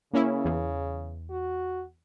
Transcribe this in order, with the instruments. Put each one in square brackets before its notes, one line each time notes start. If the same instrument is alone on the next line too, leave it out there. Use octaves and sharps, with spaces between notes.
[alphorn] C#3 [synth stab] A#3 C#4 E4
[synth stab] E2
[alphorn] F#4